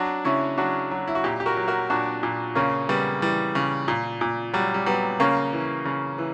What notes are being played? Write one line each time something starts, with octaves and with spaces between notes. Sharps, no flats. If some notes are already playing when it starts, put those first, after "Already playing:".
Already playing: F#3 D4 F#4
C#3 C#4 E4
F#3 D4 F#4
F#3
E4
F#4
A#2 E4 G4
G4
F#4 A#4
F#3
F#4 A#4
A#2 D4 F#4
A#2
C#3 A#3 C#4
C#3 G3 B3
E3 G3
C#3
A#2
A#2
F#3 G3
G3
F#3 G3 B3
C#3 A#3 C#4
E3
C#3
E3